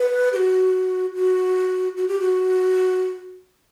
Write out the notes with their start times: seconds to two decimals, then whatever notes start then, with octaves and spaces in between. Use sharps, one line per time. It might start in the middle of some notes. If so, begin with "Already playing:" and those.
Already playing: B4
0.32 G4
0.36 F#4
1.15 F#4
1.97 F#4
2.08 G4
2.21 F#4